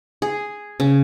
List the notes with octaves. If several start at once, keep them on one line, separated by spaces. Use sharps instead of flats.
G#4
C#3